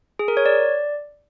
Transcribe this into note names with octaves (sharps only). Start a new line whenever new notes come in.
G#4
A#4
C#5
D5